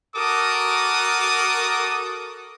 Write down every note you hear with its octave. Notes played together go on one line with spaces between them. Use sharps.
F#4 A4 A#4 D6 D#6